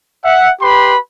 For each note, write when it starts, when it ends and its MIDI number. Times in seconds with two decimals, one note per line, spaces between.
0.23 0.49 76
0.23 0.49 78
0.60 0.95 67
0.60 0.95 71
0.60 0.95 83
0.60 0.95 84